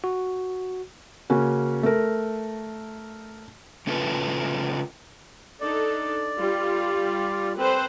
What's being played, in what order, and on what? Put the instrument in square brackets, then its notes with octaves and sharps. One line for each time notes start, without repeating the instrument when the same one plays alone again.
[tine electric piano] F#4
[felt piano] C#3 A#3 C#4 F#4
A3 A#4
[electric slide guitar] C#3 C#4 F4 A4 B4
[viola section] D4 D#4 A4 [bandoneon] D5
[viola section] G3 F4 G4
[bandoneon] C4 [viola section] A4 B4 C5